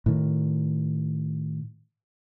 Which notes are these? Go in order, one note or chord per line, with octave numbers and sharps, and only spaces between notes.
A2 D#3